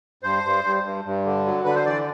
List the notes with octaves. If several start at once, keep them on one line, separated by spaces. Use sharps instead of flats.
G2 C5
G2
G2
G2
G2
D3
F#3
D3 B4
C5
E3 D5